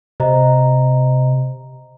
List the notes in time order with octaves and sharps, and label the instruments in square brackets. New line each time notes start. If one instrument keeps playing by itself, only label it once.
[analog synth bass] C3 [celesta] C5 D#5 A#5